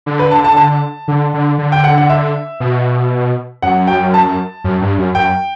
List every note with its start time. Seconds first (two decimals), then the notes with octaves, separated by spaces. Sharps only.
0.06 D3
0.19 B4
0.31 A5
0.44 A5
0.57 A5
1.08 D3
1.34 D3
1.58 D3
1.72 G5
1.84 F#5
1.98 F#5
2.10 E5
2.60 B2
3.62 F#2 F#5
3.87 G5
4.14 A5
4.64 F#2
4.81 G2
4.98 F#2
5.15 F#2 G5